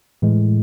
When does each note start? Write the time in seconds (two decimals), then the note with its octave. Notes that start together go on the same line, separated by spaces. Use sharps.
0.22 A2 E3 G#3